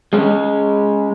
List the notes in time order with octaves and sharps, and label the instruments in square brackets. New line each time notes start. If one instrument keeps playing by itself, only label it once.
[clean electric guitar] G#3 C#4